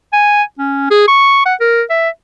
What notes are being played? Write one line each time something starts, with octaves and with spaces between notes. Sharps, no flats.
G#5
C#4
G#4
C#6
F#5
A#4
E5